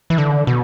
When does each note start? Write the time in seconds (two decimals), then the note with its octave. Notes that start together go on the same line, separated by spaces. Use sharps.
0.10 E3
0.18 D3
0.47 B2